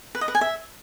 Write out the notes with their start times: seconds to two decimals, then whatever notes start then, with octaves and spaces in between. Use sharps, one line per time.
0.15 B4
0.21 D#5
0.28 B4
0.35 G#5
0.41 E5